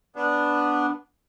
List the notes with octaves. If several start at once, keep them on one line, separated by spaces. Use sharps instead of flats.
B3 D4